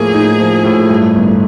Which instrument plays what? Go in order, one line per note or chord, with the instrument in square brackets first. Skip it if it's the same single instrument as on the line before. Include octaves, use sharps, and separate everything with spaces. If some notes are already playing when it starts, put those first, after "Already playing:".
Already playing: [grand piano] A2 F3 A#3 [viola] G#4
[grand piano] D#4
F3
A2
G2
G1